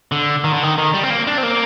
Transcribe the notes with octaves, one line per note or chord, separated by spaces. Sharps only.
D3
D#3
D3
D#3
D#3
G3
C4
A#3
D4
C4
A#3